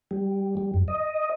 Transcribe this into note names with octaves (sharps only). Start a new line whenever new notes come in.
G3
G3
F#2
D#5